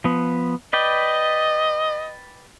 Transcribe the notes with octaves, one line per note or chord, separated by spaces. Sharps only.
F3 B3
B4 D5 D#5 G5